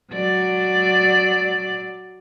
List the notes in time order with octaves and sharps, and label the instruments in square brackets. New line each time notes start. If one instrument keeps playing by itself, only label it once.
[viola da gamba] F#3 D5